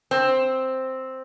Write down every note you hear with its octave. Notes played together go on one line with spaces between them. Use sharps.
C4